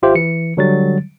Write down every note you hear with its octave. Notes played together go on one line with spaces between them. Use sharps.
G#1 F4 G4 C5 E5
E3 C#7
D3 F#3 G3 A6